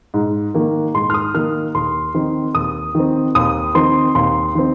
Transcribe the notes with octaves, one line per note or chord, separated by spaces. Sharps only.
G#2
D#3 A#3
G#2 C6
F6
D#6
D#3 A#3 F6
D#2 C6
D#3 C4
D#2 D#6
D#3 C4
D#2 D#6
D#3 C4 C6
D#2 C6
D#3 C4